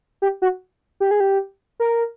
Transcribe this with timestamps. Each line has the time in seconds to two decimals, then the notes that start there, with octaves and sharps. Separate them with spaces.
0.22 G4
0.42 F#4
1.00 G4
1.11 G#4
1.20 G4
1.80 A#4